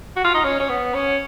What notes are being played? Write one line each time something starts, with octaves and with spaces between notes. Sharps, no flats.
F#4
F4
D#4
C#4
C#4
B3
C#4